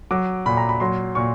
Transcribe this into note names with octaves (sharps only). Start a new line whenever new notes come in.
F#3 D6
A#2 B5
A#5
B5
F#3 C6
A#2 C#6